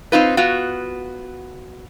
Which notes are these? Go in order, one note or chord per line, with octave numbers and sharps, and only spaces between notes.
C4 D#4 F4 B4
B3 F4 F#4